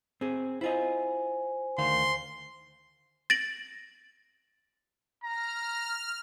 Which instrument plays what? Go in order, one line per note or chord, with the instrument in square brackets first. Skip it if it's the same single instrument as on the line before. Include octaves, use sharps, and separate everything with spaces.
[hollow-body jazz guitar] C4 G#4
[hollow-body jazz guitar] E4 F4 D#5 [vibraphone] C5 G#5
[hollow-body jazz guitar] D2 D#3 F5 [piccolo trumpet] C6
[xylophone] A6 A#6 D7 F#7
[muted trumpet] A#5 [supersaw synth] F6